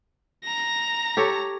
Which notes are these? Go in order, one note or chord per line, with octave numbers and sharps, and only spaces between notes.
A#5 A#6
G4 A4 C#5